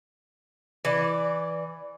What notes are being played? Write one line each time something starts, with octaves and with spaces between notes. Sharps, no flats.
E3 D5